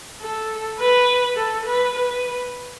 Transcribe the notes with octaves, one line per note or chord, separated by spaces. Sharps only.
A4
B4
A4
B4
B4